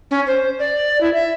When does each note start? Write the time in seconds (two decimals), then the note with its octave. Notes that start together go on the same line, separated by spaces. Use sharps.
0.11 C#4
0.27 C5
0.59 D5
1.01 E4
1.14 E5